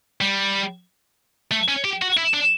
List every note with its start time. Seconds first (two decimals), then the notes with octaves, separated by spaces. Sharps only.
0.21 G3
1.51 A3
1.68 C#4
1.84 G4
2.02 F#4
2.17 E4
2.33 D4